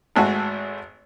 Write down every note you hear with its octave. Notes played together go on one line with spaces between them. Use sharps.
G#1 G#2 A3 F#4